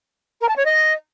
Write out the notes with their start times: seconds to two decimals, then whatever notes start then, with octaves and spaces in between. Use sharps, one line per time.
0.40 A#4
0.49 A5
0.57 C#5
0.65 D#5